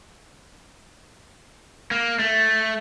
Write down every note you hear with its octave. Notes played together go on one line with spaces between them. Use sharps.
A#3
A3